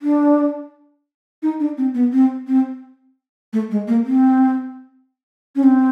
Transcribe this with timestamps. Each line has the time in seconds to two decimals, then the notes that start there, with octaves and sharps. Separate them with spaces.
0.02 D4
1.43 D#4
1.60 D4
1.78 C4
1.94 B3
2.12 C4
2.47 C4
3.53 A3
3.71 G#3
3.87 A#3
4.05 C4
5.56 C#4
5.63 C4